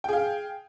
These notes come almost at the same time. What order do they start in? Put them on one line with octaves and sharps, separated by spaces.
G5 G#4 F5